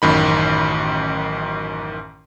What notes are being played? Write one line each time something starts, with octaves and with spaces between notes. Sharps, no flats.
A1 F#2 D#3 B5